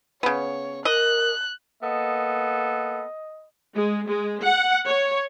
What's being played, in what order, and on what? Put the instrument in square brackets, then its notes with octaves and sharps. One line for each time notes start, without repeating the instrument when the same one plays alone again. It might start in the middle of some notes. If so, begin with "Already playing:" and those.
[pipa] C#3 B3 [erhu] C#5
[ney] A#4 [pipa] D#5 [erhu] F#6
[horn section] A#3 B3 A4 [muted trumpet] D#5
[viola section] G#3
G#3
F#5
C#5